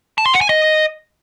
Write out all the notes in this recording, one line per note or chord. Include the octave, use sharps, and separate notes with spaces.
A5
C6
F#5
G#5
D#5